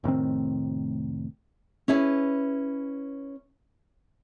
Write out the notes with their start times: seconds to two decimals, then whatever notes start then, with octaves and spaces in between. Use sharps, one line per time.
0.04 F1 A2 D#3 C4
1.88 C#4 E4 G#4 B4